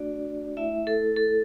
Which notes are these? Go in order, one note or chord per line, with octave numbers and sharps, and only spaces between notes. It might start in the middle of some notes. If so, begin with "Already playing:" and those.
Already playing: A3 D4 F#4 D5
A3 E4 E5
A4
A4